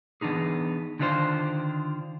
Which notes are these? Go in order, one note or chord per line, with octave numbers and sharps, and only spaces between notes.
E3 B3 D4 D#4 G#4
D3 D#3 D4 F4 G4 C5